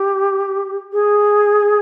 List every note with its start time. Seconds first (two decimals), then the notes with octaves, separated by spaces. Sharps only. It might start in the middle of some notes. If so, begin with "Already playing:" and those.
Already playing: G4
0.92 G#4